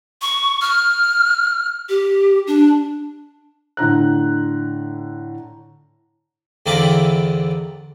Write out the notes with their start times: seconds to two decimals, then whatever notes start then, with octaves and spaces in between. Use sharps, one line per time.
0.22 C#6
0.62 F6
1.89 G4
2.47 D4
3.77 A2 D3 A#5 F#6
6.66 E2 D3 A#3 C4 E4 D6